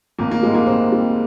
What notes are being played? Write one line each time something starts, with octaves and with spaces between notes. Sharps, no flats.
G#1 A#3
A#3
G#2 G3 G#3
A#3
G#1 C4
G#2 G3